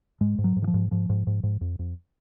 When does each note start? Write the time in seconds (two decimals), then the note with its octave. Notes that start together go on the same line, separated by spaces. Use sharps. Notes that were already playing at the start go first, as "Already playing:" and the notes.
0.21 G#2 G#3
0.38 G#2
0.44 F#3
0.56 G#2
0.62 D#3
0.67 F3
0.74 G#2
0.91 G#2 F3
1.09 G#2
1.27 G#2
1.43 G#2
1.61 F2
1.79 F2